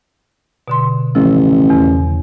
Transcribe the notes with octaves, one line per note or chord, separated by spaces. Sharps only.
B2 D3 C6
A1 C#3 F3 E6
E2